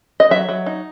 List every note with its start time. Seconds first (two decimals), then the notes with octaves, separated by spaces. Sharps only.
0.20 D#5
0.31 F#3 E5
0.49 F#3
0.66 D#4